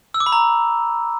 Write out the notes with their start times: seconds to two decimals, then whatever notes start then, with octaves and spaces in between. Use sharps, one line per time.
0.14 E6
0.20 D6
0.26 B5
0.32 A#5